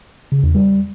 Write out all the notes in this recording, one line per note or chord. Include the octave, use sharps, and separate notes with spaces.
C#3
E2
G3